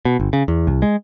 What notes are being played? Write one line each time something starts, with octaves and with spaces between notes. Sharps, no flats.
B2
G1
C#3
E2
C2
G#3